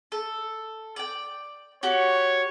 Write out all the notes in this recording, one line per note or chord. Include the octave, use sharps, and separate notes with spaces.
A4
D5 G5
F#4 G4 C#5